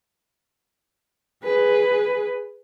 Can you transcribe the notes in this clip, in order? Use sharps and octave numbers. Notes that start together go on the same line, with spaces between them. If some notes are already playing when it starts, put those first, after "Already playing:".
G#4 B4